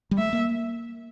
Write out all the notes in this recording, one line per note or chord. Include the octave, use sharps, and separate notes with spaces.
G3
A3 E5
A#3